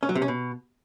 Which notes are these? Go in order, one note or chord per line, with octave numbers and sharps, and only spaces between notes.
C#4
F#3
C3
C#4
B2